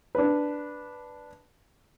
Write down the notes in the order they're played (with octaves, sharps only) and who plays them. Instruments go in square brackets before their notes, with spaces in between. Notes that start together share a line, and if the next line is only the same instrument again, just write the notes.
[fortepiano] D4 B4